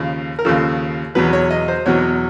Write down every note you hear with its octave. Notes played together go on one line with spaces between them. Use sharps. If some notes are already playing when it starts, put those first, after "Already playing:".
Already playing: D#2 C#3 F3
A#4
D#2 C#3 F3 A4
E2 B2 F#3 B4
C#5
D#5
C5
E2 B2 F#3 C#5